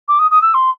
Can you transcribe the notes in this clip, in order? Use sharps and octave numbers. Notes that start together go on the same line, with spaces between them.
D6
D#6
D#6
E6
C6